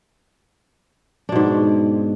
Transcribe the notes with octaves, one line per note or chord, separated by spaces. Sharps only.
G#2 B2 D4